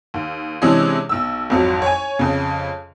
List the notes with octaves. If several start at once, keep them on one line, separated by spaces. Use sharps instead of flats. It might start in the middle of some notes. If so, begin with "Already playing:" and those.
D#2
C3 E3 G#3 C#4 D4 G#4
B1 E6
G#1 F2 F#3
C#5 G#5
F2 C#3